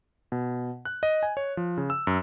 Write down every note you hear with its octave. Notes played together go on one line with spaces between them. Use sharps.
B2
F#6
D#5
G#5
C#5
F3
C#3
E6
F#2